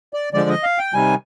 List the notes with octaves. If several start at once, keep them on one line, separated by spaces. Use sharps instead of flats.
D5
D3 F3 G#3 D5
D#5
F5
G5
C3 D#3 G3 G#5